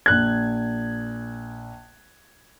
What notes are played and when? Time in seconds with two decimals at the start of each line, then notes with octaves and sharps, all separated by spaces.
0.06 A#1 F#6 G#6